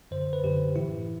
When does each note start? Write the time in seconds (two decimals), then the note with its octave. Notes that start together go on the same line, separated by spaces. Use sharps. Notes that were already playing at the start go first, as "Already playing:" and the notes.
0.11 F#2 D3 C5
0.33 B4
0.44 F#2 D3 G4
0.76 A2 E3 E4